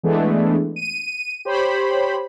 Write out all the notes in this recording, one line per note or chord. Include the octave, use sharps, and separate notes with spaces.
E3 G#3 A3 B3 D4
D#7
G4 C5 C#5 B5